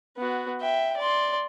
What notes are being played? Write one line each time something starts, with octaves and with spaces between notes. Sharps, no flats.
B3 F#4
E5 G5
D5 C6